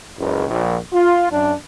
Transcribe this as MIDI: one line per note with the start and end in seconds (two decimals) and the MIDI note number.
0.18 0.47 30
0.18 0.47 37
0.48 0.78 34
0.92 1.28 65
1.32 1.53 42
1.32 1.53 62